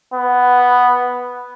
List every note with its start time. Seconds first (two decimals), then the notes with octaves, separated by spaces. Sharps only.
0.14 B3